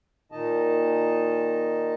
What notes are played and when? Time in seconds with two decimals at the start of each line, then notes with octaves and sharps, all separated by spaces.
0.32 A#2 D#3 D#4 D#5 A5